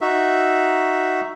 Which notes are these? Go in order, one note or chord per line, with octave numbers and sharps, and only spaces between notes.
D#4 F#4 E5